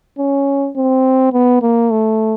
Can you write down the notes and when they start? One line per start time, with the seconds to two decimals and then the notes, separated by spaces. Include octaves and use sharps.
0.18 C#4
0.76 C4
1.33 B3
1.62 A#3
1.90 A3